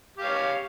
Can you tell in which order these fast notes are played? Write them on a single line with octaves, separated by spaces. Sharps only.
G4 F5 C#5